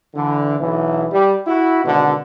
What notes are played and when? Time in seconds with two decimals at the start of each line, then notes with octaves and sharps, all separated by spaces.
0.15 D3 E3
0.59 B1 E3
1.12 G3
1.47 E4 F#4
1.85 G#1 B2 D3